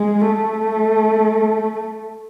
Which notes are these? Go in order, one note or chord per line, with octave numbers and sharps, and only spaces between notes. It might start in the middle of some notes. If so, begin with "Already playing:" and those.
Already playing: G#3
A3